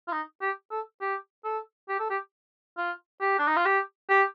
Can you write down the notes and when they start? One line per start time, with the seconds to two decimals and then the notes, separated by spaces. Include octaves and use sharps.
0.08 F4
0.12 D#4
0.42 G4
0.71 A4
1.01 G4
1.45 A4
1.89 G4
2.00 A4
2.10 G4
2.78 F4
3.21 G4
3.39 D4
3.47 D#4
3.57 F4
3.66 G4
4.10 G4